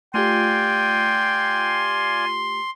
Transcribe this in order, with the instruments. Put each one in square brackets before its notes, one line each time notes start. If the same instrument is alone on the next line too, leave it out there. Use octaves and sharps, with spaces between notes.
[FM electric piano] A3 F4 G4 [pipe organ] D5 F5 G#5 [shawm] G5 [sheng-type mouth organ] C6